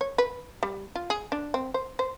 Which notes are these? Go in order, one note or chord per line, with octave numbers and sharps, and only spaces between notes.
C#5
B4
G3
F4
G#4
D4
C4
C5
C5